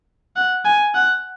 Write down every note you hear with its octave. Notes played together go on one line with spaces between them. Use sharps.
F#5
G#5
F#5